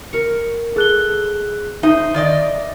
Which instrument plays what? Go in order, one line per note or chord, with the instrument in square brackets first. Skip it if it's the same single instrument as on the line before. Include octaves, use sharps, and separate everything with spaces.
[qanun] A#4 C#6
[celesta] G#4 F#6 G7 [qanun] A4
[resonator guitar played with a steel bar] D#4 [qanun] C5 [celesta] E5
[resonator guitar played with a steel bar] D#3 D5 D#5